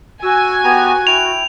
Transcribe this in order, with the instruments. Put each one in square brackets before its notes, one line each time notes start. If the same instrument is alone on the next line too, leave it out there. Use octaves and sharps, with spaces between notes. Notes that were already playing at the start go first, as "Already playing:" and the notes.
[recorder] F#4 [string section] G#5 [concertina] E6
[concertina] B3 G4 A#5
[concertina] E4 G5 [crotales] F7